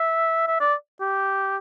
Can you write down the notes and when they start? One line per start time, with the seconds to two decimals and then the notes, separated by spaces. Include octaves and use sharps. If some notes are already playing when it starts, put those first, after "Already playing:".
Already playing: E5
0.47 E5
0.60 D5
1.01 G4